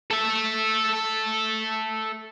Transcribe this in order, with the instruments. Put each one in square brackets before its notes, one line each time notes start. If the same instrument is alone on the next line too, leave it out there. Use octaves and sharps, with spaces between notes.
[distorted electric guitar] A4 E5